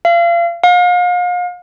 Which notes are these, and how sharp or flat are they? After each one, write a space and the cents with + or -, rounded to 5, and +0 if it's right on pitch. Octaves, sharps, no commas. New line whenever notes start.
F5 -35
F5 +40